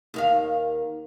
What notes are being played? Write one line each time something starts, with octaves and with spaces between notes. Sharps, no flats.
D#2 D#3 F5